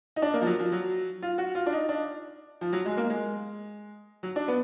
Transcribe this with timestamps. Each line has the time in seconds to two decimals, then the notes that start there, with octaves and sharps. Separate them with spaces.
0.16 D#4
0.22 D4
0.34 A#3
0.42 F3
0.46 F#3
0.59 F3
0.72 F#3
1.22 F4
1.38 F#4
1.55 F4
1.66 D4
1.73 D#4
1.89 D4
2.61 F3
2.73 F#3
2.86 G#3
2.97 A#3
3.10 G#3
4.23 F#3
4.36 D4
4.48 B3